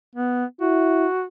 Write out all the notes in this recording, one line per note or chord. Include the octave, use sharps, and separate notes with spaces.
B3
E4 F#4